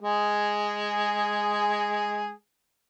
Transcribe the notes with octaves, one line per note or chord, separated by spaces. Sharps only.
G#3 G#4